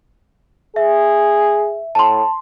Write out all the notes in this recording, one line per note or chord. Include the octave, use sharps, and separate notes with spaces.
G#4 E5
A2 A5 C6